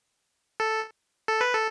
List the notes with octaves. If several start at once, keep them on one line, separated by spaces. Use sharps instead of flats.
A4
A4
B4
A4